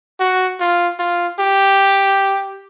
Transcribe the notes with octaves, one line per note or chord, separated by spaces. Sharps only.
F#4
F4
F4
G4